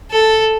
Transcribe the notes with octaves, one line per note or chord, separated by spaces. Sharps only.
A4